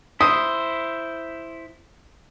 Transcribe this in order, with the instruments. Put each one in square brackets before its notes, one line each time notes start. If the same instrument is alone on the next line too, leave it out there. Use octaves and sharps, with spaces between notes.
[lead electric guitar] E4 C5 [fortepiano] D#6